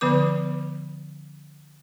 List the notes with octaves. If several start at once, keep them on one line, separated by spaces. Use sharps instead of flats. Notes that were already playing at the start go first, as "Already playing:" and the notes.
D3 F3 B3 B4 D6